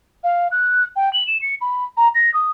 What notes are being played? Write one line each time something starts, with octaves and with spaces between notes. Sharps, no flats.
F5
F#6
G5
F#7
E7
C#7
B5
A#5
A#6
D#6